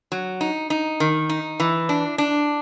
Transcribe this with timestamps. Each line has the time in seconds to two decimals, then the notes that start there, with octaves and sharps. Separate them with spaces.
0.12 F#3
0.41 D#4
0.70 D#4
1.00 D#3
1.29 D#4
1.60 E3
1.89 D4
2.18 D4